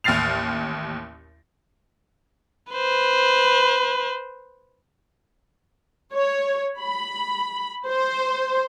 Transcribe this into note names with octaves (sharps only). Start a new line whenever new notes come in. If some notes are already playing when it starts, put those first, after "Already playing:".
A1 D#2 F6 A6 C7 F7
B4 C5
C#5
B5
C5